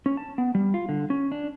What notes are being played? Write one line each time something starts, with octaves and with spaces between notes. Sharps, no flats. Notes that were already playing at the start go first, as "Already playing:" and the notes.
C#4
A5
B3
G3
F4
D3
C#4
D4